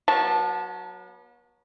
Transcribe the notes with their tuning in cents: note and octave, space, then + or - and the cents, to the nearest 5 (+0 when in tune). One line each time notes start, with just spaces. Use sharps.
F#3 +0 B3 -40 A5 +0